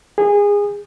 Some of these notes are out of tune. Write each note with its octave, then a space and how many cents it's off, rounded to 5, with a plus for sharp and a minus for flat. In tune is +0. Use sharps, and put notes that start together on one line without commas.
G#4 -25